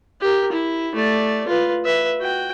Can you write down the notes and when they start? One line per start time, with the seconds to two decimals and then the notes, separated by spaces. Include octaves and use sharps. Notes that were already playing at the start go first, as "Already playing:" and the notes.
0.21 G4 A#4
0.52 E4
0.95 A3 D5
1.47 F4 B4
1.85 B4 E5
2.20 F#4 G5